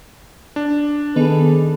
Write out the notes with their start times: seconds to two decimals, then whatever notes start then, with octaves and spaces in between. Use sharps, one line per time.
0.56 D4
1.16 D#3 B3 G#4 A4 B4